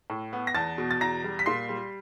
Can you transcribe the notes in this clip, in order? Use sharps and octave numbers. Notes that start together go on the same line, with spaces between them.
A2
B3
A#6
E2 A5 A6
B2
A6
E2 A#5 A#6
G3
B6
A#2 C6 C7
G3